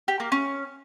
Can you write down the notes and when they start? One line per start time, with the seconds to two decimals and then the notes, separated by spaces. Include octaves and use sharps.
0.08 G4
0.20 A#3
0.32 C#4